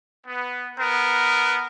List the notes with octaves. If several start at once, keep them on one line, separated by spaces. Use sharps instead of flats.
B3
B3 A#4